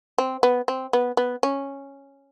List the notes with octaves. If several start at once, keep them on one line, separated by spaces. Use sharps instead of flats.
C4
B3
C4
B3
B3
C#4